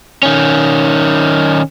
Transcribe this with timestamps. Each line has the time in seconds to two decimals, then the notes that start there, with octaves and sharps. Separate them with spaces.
0.23 D#3 C#4